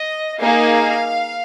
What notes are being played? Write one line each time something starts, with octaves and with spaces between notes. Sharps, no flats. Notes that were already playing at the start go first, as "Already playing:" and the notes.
Already playing: D#5
A#3 D#4 G#4 F5